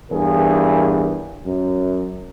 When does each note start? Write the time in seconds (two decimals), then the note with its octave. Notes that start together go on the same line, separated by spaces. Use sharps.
0.12 E2 G2 G#4 A#4
1.46 F#2